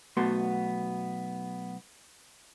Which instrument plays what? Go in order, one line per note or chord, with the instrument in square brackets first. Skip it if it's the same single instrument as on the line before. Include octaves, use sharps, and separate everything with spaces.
[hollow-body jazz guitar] B1 A3 B3 F#4 C6